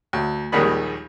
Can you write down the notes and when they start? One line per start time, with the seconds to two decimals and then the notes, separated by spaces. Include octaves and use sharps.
0.13 D2
0.52 A#1 D#2 D#3 G3 G#3 B5